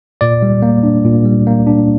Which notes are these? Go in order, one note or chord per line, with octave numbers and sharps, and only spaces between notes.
A#2 D5
G3
A#3
D4
A#2
G3
A#3
D4